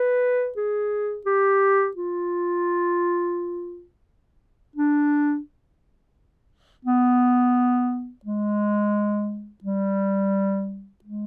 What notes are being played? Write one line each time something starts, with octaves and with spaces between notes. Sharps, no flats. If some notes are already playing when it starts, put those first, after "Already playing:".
Already playing: B4
G#4
G4
F4
D4
B3
G#3
G3
G#3